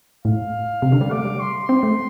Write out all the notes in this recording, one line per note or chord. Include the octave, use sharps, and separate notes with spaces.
A2 F5
C3
D3
G3
A3 D6
G3
C6
C4 C6
A3